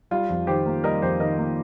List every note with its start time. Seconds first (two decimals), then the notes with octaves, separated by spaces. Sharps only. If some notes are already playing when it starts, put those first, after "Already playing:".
0.11 G3 F4
0.29 F2
0.47 D#3 G4 C5
0.66 A#3
0.84 G3 A#4 D#5
1.02 F2 G4 C5
1.20 D#3 A#4 D#5
1.38 A#3